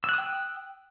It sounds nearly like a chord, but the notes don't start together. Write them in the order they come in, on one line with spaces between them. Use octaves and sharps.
E6 F#6 D#6 G5